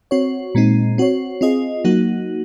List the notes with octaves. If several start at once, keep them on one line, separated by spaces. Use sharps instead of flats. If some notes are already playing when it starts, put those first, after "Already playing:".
C4 F#4 C#5
A#2 G#3 C4 D#4
C4 F#4 C#5
C4 F4 G#4 D#5
F#3 A#3 D#4 F#4